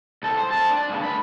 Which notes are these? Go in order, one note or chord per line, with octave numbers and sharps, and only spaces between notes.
C2 A4
C5
C4 A5
D4
G2 C#3
D2 B5